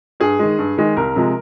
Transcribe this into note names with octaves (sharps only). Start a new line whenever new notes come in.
G2 G#4
D#3 G#3
G2
D#3 G#3
C2 A#4
C3 F3 G#3